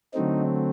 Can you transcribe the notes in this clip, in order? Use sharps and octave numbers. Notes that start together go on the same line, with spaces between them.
D3 F#3 A3 C4 D#4